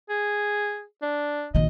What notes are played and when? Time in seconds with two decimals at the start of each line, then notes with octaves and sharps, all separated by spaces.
0.09 G#4
1.02 D4
1.55 A#1 D#3 D#5